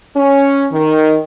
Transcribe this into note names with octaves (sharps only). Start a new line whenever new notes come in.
C#4
D#3